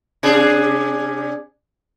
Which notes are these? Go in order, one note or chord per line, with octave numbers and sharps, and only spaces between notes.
C3 D4 G#4